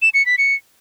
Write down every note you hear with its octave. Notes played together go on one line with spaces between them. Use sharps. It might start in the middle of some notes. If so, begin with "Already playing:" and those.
E7
C#7
B6
C#7